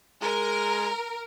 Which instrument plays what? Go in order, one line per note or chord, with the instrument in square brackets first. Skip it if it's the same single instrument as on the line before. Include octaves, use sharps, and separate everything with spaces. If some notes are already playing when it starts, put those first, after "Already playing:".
[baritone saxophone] G#3 [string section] A#4